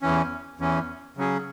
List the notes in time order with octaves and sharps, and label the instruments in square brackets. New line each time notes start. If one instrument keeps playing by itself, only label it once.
[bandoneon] E2 E3 C#4
E2 E3 C#4
C#3 F#3 C#4 G#4